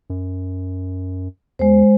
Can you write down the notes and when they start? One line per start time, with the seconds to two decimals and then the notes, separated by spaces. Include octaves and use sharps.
0.10 F#2
1.59 E2 G#3 C5